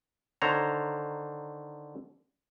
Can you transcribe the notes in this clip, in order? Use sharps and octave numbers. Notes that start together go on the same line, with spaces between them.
D3 D#3 C5 C#5 A#5